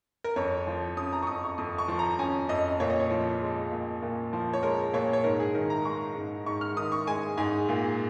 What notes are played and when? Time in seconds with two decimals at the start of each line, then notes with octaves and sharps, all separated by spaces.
0.24 A#4
0.36 F2 C#5
0.67 F3
0.97 C#4 D#6
1.13 A#5
1.23 C#6
1.27 F2 D#6
1.43 C#6
1.58 F2 D#6
1.78 C#6
1.88 F3
1.99 A#5
2.19 C#4 G#5
2.49 F2 D#5
2.80 A#2 C#5
2.90 D#5
3.00 C#5
3.11 F3
3.41 G#3
3.72 A#2
4.02 A#2
4.33 F3
4.53 C#5
4.63 G#3 A#4
4.94 A#2 C#5
5.13 C#5
5.24 G#2 A#4
5.40 G#4
5.54 D#3 A#4
5.70 A#5
5.85 G#3 C#6
6.15 G#2
6.46 G#2 C#6
6.61 F6
6.77 D#3 D#6
6.92 C#6
7.07 G#3 G#5
7.38 G#2 G#5
7.69 A#2 G#4
7.84 G#4